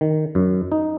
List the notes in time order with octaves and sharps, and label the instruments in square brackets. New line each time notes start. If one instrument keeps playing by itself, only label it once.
[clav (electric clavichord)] D#3
F#2
D#4